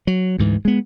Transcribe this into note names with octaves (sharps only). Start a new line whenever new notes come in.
F#3
D2 G#2 E3
G#3 B3